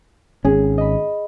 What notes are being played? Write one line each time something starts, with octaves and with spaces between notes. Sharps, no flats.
G#1 C#4 G#4
D#5 B5